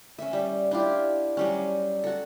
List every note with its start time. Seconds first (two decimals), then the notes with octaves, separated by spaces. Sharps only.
0.19 C#4 E5
0.33 G3
0.71 D4 E4 F4 G4
1.37 F#3 G3 C#4
2.04 F#4 A4